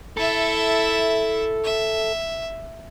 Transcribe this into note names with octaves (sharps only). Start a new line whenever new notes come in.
E4 A4 E5
E5